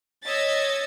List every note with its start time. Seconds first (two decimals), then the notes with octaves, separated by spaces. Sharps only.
0.25 C#5 D#5 E6 G#6 A6 B6